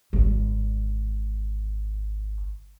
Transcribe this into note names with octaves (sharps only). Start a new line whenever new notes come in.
G#1 D3